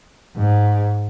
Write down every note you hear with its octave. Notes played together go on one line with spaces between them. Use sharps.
G#2